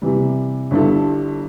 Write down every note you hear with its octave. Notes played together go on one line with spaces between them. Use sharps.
C3 E3 G3
G1 G2 G3 E4 A4